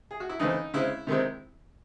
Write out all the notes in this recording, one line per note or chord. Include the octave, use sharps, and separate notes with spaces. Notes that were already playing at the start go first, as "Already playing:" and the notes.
G#4
F#4
E4
C#3 E3 A3 C4 D#4
C#3 G#3 C4 E4
C3 D#3 G#3 C4